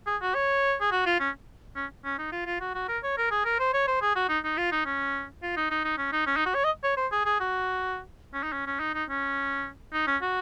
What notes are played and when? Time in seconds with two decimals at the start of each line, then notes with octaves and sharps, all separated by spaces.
0.07 G#4
0.21 F#4
0.35 C#5
0.81 G#4
0.91 F#4
1.06 F4
1.20 C#4
1.76 C#4
2.04 C#4
2.18 D#4
2.32 F4
2.46 F4
2.60 F#4
2.75 F#4
2.88 A#4
3.03 C#5
3.17 A#4
3.31 G#4
3.45 A#4
3.59 C5
3.73 C#5
3.87 C5
4.01 G#4
4.15 F#4
4.29 D#4
4.44 D#4
4.57 F4
4.72 D#4
4.86 C#4
5.42 F4
5.56 D#4
5.70 D#4
5.84 D#4
5.98 C#4
6.12 D#4
6.26 C#4
6.36 D#4
6.46 F#4
6.54 C#5
6.64 D#5
6.83 C#5
6.97 C5
7.12 G#4
7.25 G#4
7.40 F#4
8.33 C#4
8.43 D#4
8.52 C#4
8.66 C#4
8.80 D#4
8.94 D#4
9.09 C#4
9.93 D#4
10.07 C#4
10.22 F#4